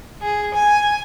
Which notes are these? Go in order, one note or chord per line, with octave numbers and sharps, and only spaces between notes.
G#4
G#5